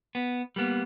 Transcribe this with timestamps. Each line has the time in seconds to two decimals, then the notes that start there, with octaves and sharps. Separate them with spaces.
0.15 B3
0.56 G3 A#3 B3